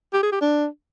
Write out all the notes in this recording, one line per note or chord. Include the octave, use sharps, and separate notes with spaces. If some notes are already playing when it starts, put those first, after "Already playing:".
G4
G#4
G4
D4